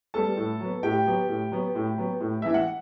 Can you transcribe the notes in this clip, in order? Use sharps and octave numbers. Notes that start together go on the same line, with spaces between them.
G3 B3 A4 A5
A2
F#3 B3
A2 G4 G5
F#3 B3
A2
F#3 B3
A2
F#3 B3
A2
E3 B3 E5
F#5